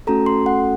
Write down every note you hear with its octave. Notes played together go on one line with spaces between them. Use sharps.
A3 C#4 F#4 A4 A#5
C6
F#5